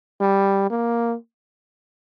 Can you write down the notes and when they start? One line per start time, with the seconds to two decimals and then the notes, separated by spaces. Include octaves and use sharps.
0.20 G3
0.70 A#3